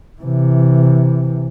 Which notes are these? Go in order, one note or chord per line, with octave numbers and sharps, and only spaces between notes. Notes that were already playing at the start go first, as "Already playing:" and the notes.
C3 E3